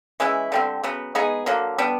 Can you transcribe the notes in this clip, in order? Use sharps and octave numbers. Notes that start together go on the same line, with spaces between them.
E3 G#3 C#4 E4
D3 G3 C4
C#3 F#3 B3
G#3 B3 D#4 G#4
D3 F#3 A#3
G3 B3 D4